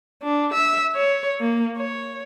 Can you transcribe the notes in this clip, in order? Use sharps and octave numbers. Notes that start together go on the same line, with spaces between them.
D4
E5
C#5
A#3
C#5